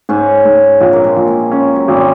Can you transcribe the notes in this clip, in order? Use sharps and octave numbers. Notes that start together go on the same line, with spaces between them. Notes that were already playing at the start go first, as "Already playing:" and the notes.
G#2 C#4
G#2
A#1 C4
A#3
G#3
A#1
G#3
G#3 C#4
F#3
G#1